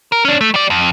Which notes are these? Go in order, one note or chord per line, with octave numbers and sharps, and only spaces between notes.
A#4
C#4 D4
A3
G3 D5
F2